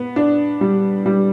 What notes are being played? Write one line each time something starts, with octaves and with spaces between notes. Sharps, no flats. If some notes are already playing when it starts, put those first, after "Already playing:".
Already playing: B3
D4
G3
G3